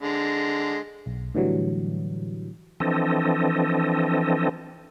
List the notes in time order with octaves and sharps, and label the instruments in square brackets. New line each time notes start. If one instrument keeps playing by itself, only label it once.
[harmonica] D3 G#3
[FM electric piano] B1
A2 D3 E3 F#3 G3
[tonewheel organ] E3 F3 C4 D4 A4 D#5